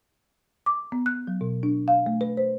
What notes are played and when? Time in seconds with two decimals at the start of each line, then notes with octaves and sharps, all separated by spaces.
0.66 D6
0.92 B3
1.06 F#6
1.27 F#3
1.41 B2
1.63 D4
1.88 F5
2.06 A3
2.21 B4
2.37 C5